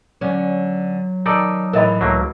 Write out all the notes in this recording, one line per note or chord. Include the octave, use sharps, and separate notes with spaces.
D3 F#3 C#4
D#3 D#4 A4 D5
A2 E3 A#4 D#5 B5
C#2 F#3 A3 A#3